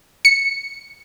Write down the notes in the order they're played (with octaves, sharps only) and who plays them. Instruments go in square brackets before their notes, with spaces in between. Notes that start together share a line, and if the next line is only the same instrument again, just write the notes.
[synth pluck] C#7